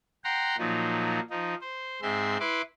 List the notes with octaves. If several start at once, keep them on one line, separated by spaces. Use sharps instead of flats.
F#5 G5 A#5 C6
A#2 F3 F#3 D#4
F3 D#4
C5
G#2 G#3 C4 E5 C6
E4 B4 C6 D6